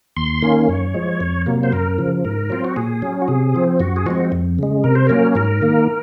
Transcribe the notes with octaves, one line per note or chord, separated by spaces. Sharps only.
D#2 C6
D#3 A#3 C#4
F#2 C#5
F3 G#3
F2
C3 F#3 A#3
C5
F#2 A#4
C#3 F3
G#2 A#4
F#3 C4 F4
F#4
A#2 G#4
F#3 C#4
F#4
C3 G#4
F3 C4
F#2 F#4
G#4
F3 G#3 C4 F#4
F2
C#3 G#3
C3 A#4
C5
F#3 A#3 C#4 A#4
G#2 A#4
D#3 A#3